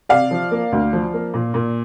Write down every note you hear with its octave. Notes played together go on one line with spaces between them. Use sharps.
C3 D5 F5
F3
A#3
D2
F3
A#3
A#2
A#2